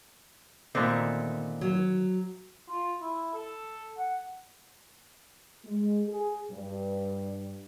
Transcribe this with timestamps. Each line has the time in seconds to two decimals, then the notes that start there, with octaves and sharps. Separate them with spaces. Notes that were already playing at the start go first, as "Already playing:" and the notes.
0.75 A#2 D3 D#3 A3 B3 C4
1.61 F#3
2.69 F4
3.02 E4
3.34 A4
3.98 F#5
5.64 G#3
6.08 G#4
6.51 G2